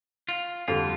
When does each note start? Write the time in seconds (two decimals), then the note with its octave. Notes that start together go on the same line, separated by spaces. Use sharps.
0.29 F4
0.68 F2 D3 G3 F4